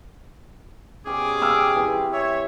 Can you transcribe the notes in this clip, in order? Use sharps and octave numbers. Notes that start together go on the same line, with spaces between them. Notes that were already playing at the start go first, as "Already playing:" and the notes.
B2 C#4 G4 G#4 C5 D6
G5 E6 F6
E3 C4 G5 B5
C#5 E5